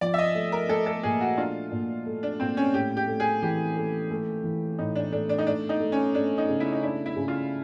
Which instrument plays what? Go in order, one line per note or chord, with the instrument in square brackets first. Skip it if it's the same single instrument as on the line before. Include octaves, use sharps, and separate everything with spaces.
[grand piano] F3 [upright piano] D5
[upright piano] E5
D#5
[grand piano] A3
[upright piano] A#4
[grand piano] A3 [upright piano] A4
[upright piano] A4
[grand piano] A#2 [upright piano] G#4
[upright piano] F#4
[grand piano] D4 [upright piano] F4
[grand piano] A#2
A3
[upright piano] D4
[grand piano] A#2 [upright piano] C4
[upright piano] C#4
[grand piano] A2 [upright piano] G4
[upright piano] G4
[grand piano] A3
[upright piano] G#4
[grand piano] E3 [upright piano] G4
[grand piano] A3
A3
E3
[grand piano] A2 [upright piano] D#4
[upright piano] D4
[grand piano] A3 [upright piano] D4
[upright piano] D4
D#4
[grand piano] A3 [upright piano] D4
[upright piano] D#4
[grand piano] A3
[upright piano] C#4
[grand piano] A3 [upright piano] D4
[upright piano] D#4
[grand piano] C#3
[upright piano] E4
D#4
[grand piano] D4 [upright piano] E4
[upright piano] E4
[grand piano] C#3
[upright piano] F4